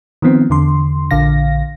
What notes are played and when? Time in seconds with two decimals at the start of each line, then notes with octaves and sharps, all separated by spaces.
0.22 D#3 F3 B3 C4
0.50 E2 D3 C6
1.11 A#1 D3 F5 A#6